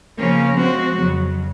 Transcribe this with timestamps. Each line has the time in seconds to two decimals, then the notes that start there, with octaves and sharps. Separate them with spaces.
0.18 C#3 F3 A#3 C#4
0.59 F3 G#3 C4 F#4
0.99 F2 C#3 F#3